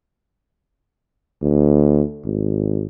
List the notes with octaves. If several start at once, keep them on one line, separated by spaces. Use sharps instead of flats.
D2
G#1